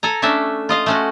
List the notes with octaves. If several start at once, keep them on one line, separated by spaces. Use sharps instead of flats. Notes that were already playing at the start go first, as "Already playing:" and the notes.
A4 G#5 A#5
A3 C#4 D4 E5
F4 D#5 F5
A3 C#4 F#4